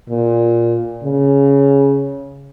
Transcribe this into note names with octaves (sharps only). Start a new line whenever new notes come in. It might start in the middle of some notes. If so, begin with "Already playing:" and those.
A#2
C#3